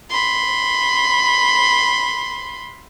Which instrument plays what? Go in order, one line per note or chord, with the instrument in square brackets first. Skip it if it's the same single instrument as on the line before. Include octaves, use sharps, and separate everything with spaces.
[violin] B5 C6